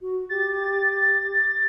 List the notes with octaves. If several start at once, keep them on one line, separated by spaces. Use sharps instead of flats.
F#4
G4 A6